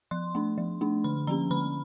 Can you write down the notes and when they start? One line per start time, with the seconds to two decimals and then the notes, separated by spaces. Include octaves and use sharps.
0.11 F3 C6
0.35 A3 D4
0.58 F3
0.81 A3 D4
1.04 D3 B5
1.27 F3 A#3 C#4 A#5
1.51 D3 B5